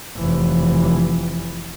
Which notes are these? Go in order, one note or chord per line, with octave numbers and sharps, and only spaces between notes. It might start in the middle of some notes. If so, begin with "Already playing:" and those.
F1 E3